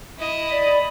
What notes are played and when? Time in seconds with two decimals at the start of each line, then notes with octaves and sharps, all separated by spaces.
0.18 E4 D#5
0.50 D5 B5